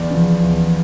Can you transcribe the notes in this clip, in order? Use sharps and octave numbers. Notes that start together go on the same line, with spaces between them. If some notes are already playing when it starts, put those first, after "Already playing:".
Already playing: E2 D5
C#3 F3
E2